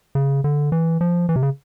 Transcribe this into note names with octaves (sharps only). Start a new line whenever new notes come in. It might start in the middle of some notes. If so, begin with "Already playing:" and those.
C#3
D3
E3
F3
E3
C3
C#3